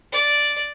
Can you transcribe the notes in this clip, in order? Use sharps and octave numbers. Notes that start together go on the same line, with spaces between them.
D5